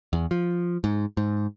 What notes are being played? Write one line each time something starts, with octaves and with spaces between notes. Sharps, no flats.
E2
F3
G#2
G#2